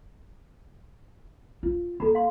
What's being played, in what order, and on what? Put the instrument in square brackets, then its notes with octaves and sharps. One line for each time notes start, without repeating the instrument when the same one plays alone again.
[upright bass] F4
[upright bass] A#3 [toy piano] A4 A#5 B5
[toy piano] F5 C6